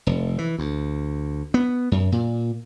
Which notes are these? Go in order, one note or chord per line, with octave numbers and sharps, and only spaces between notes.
F1
E3
D2
B3
F#2
A#2